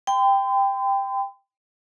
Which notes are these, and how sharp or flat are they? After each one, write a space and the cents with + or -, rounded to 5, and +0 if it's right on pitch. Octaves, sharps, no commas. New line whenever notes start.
G5 +10 C6 -45